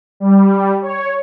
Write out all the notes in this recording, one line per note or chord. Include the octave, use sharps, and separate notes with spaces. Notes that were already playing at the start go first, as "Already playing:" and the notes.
G3
C#5